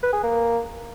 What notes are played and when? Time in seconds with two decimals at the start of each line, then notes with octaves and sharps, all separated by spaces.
0.03 B4
0.13 G#4
0.23 A#3